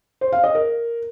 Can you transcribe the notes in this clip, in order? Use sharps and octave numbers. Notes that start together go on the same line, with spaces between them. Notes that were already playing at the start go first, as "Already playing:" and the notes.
C5
F5
D#5
A#4